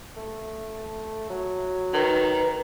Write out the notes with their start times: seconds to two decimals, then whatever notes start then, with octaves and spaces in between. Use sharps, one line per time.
0.17 A3
1.30 F#3
1.94 D#3 B4